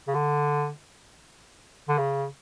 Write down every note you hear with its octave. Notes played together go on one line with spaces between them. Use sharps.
C#3
D3
D3
C#3